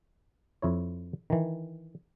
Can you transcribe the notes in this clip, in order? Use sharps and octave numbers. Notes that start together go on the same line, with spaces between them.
F2 E4 C#5
D#3 E3